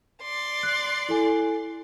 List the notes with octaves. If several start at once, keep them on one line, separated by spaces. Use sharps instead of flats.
D5 C6
F#6 C7
E4 A4 G#5